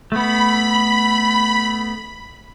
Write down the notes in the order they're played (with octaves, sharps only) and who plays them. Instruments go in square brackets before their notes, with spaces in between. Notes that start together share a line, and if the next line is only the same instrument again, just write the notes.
[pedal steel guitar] A3 B3 [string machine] B5